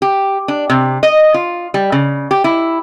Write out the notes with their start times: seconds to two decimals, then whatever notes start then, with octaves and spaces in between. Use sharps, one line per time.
0.02 G4
0.48 D4
0.70 C3
1.03 D#5
1.34 F4
1.74 G3
1.92 C#3
2.31 G4
2.44 E4